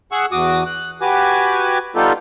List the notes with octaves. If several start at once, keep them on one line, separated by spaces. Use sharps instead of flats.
G#4 F#5 C#6 E6
E2 F#4 D6 D#6
F#6
F#4 G4 B4 G#5 D6
G3 B3 D#4 F4 G4 A4